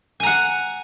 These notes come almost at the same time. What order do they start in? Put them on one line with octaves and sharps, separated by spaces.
G#5 A#5 F#5